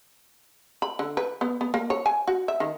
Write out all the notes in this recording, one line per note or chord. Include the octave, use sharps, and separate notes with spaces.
B5
D3
B4
B3
B3
A#3
C#5
G#5
F#4
E5
D#3